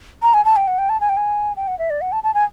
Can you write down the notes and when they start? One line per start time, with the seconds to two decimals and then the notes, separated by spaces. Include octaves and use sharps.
0.22 A#5
0.34 G#5
0.45 A5
0.56 G5
0.68 F#5
0.78 G5
0.89 A5
1.01 G#5
1.09 G5
1.17 G#5
1.57 G5
1.68 F#5
1.79 E5
1.90 D5
2.01 F#5
2.12 A5
2.24 A5
2.34 G#5